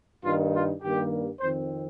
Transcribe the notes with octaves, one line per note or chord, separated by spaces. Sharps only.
G2 D#3 A#3 D#4 F4
F4
G2 D#3 G3 A#3 G4
F2 D#3 C4 C5